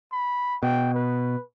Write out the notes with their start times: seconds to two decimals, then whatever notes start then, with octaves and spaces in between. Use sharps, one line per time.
0.12 B5
0.63 B2 G5
0.95 B4